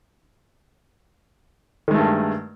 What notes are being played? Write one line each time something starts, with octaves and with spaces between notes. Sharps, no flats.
G2 D#3 G#3 A3